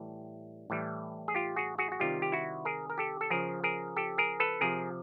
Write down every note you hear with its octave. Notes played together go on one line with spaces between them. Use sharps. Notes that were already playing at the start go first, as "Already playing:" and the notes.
Already playing: A2 E3 G3
A2 E3 G3
G#4
F4 G4
F#4 G#4
F#4 G#4
F#4
C3 D#3 G3 F4 G4
G4
E4 F#4
G#4 A#4
A#4
G4 A4
A4
C#3 F3 G#4 A#4
G#4 A#4
G4 A4
G#4 A#4
A4 B4
C3 F3 G#4 A#4